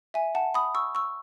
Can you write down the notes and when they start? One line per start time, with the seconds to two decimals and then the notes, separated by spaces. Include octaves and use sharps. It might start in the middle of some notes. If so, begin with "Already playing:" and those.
0.14 E5 G#5
0.35 F#5 A5
0.54 B5 D#6
0.75 C#6 E6
0.95 C#6 E6